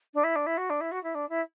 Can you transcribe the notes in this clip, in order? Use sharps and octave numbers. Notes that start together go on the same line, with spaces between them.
D4
E4
D4
E4
F#4
D4
E4
F#4
E4
D4
E4